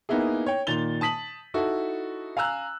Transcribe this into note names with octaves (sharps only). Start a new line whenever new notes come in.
A#3 B3 D#4 E4 G#4
C#5 G5
A#2 D#3 A6 F7 G7
A5 D#6 B6 F#7
D#4 E4 F#4 A4
F5 G#5 A#5 E6 F#6